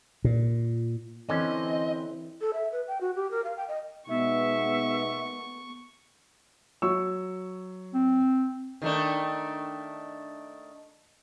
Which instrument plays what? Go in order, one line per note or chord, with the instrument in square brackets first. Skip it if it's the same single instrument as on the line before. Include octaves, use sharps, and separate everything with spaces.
[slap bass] A#2
[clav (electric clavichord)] D3 C#4 [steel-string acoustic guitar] E3 [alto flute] C4 [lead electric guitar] D#5
[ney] A4
E5
B4
G5
F#4
G4
A#4
F5
G5
D#5
[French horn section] B2 G#3 D#4 [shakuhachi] B3 [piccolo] E5 [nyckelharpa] C#6
[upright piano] F#3 C#6 E6
[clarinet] C4
[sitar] D#3 A3 D4